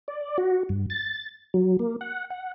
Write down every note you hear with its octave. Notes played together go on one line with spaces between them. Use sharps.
D5
F#4
G2
A6
F#3
A#3
F#5
F#5